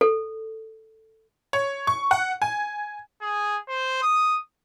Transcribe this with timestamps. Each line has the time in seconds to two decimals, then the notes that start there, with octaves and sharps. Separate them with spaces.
0.01 A4
1.53 C#5
1.87 C#6
2.11 F#5
2.42 G#5
3.22 G#4
3.68 C5
4.02 D#6